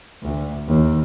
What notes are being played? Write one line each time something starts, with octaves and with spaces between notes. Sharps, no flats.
D2
D#2